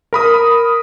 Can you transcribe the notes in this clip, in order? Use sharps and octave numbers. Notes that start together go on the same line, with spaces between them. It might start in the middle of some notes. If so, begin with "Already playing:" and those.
A#4 B5 D#6